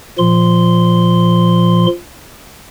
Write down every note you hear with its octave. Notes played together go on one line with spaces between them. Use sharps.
A#2 F3 C6